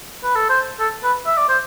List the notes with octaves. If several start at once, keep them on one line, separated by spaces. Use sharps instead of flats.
B4
A4
C5
A4
B4
E5
D5
C5